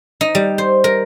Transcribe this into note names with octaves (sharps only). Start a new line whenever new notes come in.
D#4
G3
C5
A#4